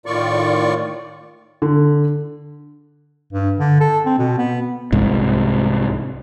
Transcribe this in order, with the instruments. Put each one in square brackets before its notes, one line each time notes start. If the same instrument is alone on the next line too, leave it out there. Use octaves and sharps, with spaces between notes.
[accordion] A2 D#3 F4 D5 C#6
[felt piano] D3
[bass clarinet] G2
D3
A4
C4
B2
B3
[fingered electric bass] C2 G#2